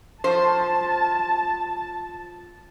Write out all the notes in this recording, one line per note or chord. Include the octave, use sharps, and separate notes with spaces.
F3 C5 A5